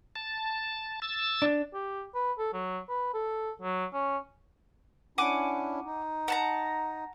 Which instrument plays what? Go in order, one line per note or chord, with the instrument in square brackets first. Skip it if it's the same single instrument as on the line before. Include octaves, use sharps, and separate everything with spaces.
[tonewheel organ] A5
E6 A6
[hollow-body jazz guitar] D4
[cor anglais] G4
B4
A4
F#3
B4
A4
F#3
C#4
[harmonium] C#4 D4 E4 [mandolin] F#5 G#5 D6
[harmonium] D#4
[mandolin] F#5 A5 A#5